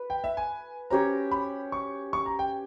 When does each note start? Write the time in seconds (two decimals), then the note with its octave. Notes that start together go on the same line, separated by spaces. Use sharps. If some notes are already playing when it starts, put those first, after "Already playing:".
Already playing: B4
0.10 G5
0.24 E5
0.37 G#5
0.90 C#4 G4 C#5 A#5
1.31 B5
1.72 C#6
2.13 C#6
2.26 A#5
2.39 G5